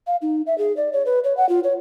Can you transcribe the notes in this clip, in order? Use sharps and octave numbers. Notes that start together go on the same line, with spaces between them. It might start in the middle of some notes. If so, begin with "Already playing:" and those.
F5
D#4
E5
G#4
D5
C#5
B4
C#5
F#5
F4
C#5